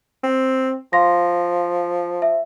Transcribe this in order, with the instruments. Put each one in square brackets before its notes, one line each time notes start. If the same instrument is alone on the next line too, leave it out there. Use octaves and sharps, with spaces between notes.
[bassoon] C4
[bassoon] F3 [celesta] F5 C6 A#6
[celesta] E5